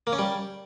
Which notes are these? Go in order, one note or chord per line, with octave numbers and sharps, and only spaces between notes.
A#3
C#4
G3